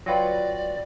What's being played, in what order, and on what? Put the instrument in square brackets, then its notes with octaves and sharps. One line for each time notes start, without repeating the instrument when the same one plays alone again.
[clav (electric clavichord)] F#3 F4 B4 [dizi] D5 [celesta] G5 A#6